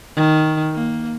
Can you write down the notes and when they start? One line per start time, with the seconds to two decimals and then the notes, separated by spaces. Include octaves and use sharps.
0.16 D#3
0.73 A#3